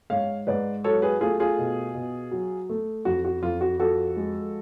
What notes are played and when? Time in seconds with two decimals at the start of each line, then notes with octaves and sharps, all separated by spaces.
0.10 G#2 C#5 F5
0.47 G#2 B4 D5
0.84 F#3 A4 C#5
1.02 G#4 B4
1.21 A3 F4 G#4
1.40 F4 G#4
1.58 B2
1.95 B2
2.31 F#3
2.69 A3
3.05 F2 F#4
3.25 F#4
3.42 F2 F4
3.61 F#4
3.80 F3 F#4 A4
4.17 G#3